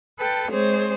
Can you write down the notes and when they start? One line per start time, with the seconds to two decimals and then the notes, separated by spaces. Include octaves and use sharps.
0.18 A4 B4 G5 A5
0.51 G#3 C4 G#4 C5 C#5